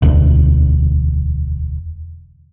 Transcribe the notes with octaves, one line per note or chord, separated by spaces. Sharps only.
E1 D2